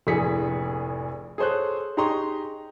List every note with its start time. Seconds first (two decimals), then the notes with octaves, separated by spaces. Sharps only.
0.07 F1 A#1 A2 G#4 B6 C#7
1.38 G#4 A4 C5 C#5 F#6
1.97 D#4 G4 G#4 A#5 C6 C#6